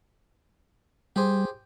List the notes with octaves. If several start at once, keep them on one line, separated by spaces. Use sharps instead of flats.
G3 G4 G#4 C5